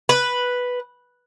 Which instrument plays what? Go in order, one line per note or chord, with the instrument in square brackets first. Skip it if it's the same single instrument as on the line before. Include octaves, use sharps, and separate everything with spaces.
[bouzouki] B4